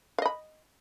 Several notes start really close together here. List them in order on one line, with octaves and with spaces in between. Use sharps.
F5 D#5 B5